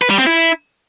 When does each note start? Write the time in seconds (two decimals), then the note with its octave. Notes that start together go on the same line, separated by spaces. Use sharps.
0.02 B4
0.10 G3
0.18 C4
0.27 E4